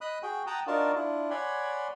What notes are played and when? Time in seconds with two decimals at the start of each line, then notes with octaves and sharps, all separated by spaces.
0.01 D#5 B5 D#6 F#6
0.23 F#4 G#4 G5
0.47 F#5 G5 A5 A#5 D#6
0.67 D4 D#4 F4 F#4 A#4 A5
0.95 D4 E4 F4
1.30 C#5 D5 F#5 G#5 B5 C6